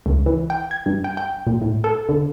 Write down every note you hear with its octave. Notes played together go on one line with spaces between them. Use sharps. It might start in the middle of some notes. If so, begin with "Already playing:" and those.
C#2
E3
G5
G#6
G2
G5
G5
A#2
A2
A4
D3